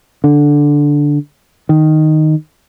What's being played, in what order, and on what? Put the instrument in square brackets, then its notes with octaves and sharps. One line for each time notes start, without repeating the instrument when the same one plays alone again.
[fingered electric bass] D3
D#3